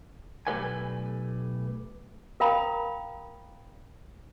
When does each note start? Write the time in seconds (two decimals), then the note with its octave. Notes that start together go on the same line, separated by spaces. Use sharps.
0.47 B1 A3 G4 B4 D5 G#5
2.40 A#4 F5 G5 A#5 B5 D#6